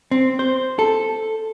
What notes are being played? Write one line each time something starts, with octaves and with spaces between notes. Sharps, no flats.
C4
C5
A4